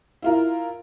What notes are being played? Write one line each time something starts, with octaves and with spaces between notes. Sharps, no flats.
E4 F4 A#4